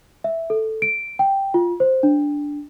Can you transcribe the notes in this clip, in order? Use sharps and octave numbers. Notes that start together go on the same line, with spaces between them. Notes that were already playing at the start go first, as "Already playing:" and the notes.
E5
A4
D7
G5
F4
C5
D4